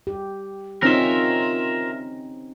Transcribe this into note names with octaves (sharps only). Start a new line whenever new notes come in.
G4
C4 C#4 D#4 F4 A#4 E5